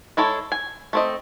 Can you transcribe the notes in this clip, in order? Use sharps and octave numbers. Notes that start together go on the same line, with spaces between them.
G#3 E4 A4 C#5
G#5
A3 C4 D#5